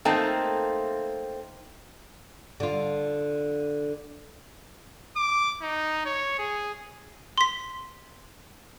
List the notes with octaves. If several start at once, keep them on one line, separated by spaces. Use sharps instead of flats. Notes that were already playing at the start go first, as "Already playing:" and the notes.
A3 A#3 C4 D#4 F4 G5 A5
D3 F4
D6
D#4
C#5
G#4
C6 B6